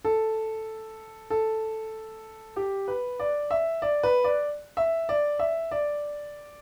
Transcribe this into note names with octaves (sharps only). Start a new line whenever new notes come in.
A4
A4
G4
B4
D5
E5
D5
B4
D5
E5
D5
E5
D5